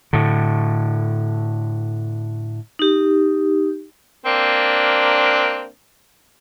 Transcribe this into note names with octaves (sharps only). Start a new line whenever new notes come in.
A2 D3
D#4 G4
A#3 C4 D4